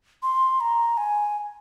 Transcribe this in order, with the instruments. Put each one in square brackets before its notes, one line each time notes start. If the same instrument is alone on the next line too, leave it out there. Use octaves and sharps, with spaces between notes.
[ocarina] C6
A#5
G#5